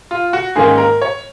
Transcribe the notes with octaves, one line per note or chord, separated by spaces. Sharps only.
F4
F#4
G#2 D#3 A#3 C#4 G#4
A#4
C#5